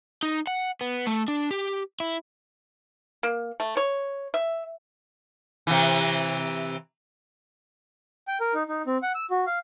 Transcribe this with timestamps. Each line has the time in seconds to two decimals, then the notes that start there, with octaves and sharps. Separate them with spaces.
0.23 D#4
0.47 F#5
0.81 B3
1.07 A3
1.28 D4
1.51 G4
2.00 E4
3.23 A#3
3.60 A3
3.77 C#5
4.34 E5
5.67 C3 E3
8.28 G5
8.41 A#4
8.54 D#4
8.68 D#4
8.87 C4
9.03 F#5
9.15 E6
9.31 F#4
9.46 F5